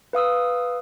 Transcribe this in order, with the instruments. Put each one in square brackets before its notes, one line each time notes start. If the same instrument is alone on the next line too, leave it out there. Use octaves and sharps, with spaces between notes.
[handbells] B4 F5 D#6 E6